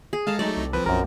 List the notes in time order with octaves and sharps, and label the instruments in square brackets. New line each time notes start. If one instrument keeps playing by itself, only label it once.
[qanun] G#4
[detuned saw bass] G#3 [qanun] A4 A5 A#5 [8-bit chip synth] F5
[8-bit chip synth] F#3 A3 D#4 [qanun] D5
[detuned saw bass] C2
[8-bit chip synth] F3 C4 [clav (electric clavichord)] B4
[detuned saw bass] B1 [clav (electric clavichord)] F#2 A#4